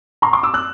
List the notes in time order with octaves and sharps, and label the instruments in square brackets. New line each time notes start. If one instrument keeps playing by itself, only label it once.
[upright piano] A#5 C6
C6 D6
D6 E6
E6 F#6